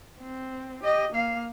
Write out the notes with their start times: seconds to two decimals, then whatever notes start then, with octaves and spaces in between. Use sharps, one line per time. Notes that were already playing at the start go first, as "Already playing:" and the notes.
0.20 C4
0.83 G4 D#5
1.11 A#3 F5